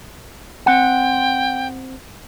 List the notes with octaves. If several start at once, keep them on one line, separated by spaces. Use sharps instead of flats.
C4 F#5 G5